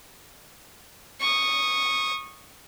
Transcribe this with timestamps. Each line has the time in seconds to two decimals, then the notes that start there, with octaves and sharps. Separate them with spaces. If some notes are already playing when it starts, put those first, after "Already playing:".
1.21 C#6 D#6